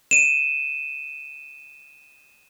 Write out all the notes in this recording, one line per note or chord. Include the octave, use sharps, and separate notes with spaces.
D#7 E7